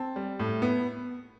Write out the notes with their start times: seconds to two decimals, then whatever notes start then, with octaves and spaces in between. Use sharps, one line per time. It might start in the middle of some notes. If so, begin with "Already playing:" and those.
Already playing: C4 A5
0.16 G3
0.39 A2
0.62 B3